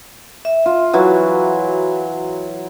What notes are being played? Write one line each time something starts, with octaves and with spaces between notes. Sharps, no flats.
E5
F4
E3 F#3 F#4